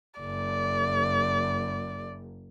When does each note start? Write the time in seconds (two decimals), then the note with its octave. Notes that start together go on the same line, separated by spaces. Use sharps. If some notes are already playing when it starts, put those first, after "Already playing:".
0.20 F#1 D5